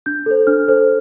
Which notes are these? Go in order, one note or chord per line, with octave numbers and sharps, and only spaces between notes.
D4 G6
A4 C5
D4 F6
A4 C5